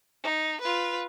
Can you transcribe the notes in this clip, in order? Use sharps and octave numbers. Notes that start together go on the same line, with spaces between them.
D#4
F4 B4